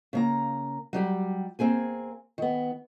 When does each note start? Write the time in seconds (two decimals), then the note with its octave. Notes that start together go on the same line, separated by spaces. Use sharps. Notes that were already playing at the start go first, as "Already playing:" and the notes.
0.13 C#3 A#3 A#5
0.93 F#3 G3 G4
1.59 A#3 C4 G#4 G#5
2.38 D#3 B3